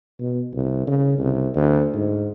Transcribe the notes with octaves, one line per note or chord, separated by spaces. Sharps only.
B2
C2
C#3
C2
D2
G#2